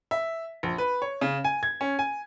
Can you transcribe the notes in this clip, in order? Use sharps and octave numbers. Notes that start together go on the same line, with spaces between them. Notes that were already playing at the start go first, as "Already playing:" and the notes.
E5
A#1
B4
C#5
C#3
G#5
G#6
C#4
G#5